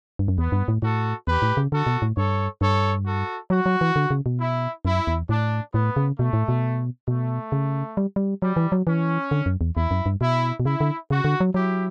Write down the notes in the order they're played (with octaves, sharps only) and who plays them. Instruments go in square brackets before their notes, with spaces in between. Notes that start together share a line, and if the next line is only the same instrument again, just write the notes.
[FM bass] G2
F#2
[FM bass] E2 [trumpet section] B3
[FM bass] G2
A2
[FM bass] A2 [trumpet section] F#4 A4
[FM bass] E2 [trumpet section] G4 B4
[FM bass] A2
C#3
[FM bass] D3 [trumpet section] F#4 A4
[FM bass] B2
A2
[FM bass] G2 [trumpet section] A4 C#5
[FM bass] G2 [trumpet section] A4 C#5
[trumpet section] F#4 A4
[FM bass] F#3 [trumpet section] F#4
[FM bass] F#3
E3
D3
C#3
B2
[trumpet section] E4
[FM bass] F#2 [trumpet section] E4
[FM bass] E2
[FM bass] A2 [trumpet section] D4
[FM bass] A2 [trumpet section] B3
[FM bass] C#3
[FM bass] B2 [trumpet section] A3
[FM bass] A2
B2
[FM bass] B2 [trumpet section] A3
[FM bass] C#3
G3
G3
[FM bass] F#3 [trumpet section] G3
[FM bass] E3
F#3
[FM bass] E3 [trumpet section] C#4
[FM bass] D3
F#2
E2
[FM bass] E2 [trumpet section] E4
[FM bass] F#2
G2
[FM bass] B2 [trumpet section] E4
[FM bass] B2
[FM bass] C#3 [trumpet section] E4
[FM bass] D3
[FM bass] C#3 [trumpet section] F#4
[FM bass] D3
F#3
[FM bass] F#3 [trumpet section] E4 G4